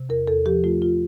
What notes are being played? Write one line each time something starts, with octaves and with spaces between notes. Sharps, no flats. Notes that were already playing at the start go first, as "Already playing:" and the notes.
Already playing: C3
E2 A#4
E2 A4
F3 G4
A3 F4
F4